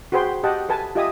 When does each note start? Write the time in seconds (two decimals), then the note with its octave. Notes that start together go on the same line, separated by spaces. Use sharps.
0.12 F#4 G#4 B4 C5 G5 C6
0.44 G4 D#5 F#5 G5 A5
0.69 A4 B4 G#5 A5
0.95 F4 G4 D#5 E5 G#5 D#6